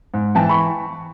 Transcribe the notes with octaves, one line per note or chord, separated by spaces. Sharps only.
G#2
E3 G5 A5
B5 C#6